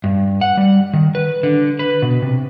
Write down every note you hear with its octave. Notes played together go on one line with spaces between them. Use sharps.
G2
F#5
G3
D#3
B4
D3
B4
B2
C3